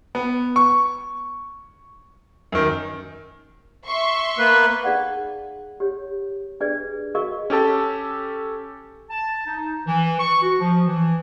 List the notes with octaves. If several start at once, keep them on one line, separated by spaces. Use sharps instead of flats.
B3
C#6
F#2 D#3
E5 C6 C#6
A#3 B3 B4
D#4 G#4 D5 F5 F#5
G4 C#5
D4 G#4 B4 D5
F#4 G#4 A#4 D#5 F5 C#6
C#4 G4 A4 A5
A5
D#4
E3
C#6
F#4
F3
E3